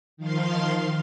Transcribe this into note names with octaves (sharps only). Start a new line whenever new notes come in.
D#3 F3 F5 C6